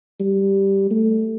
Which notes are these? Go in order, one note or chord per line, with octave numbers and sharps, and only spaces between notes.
G3
A3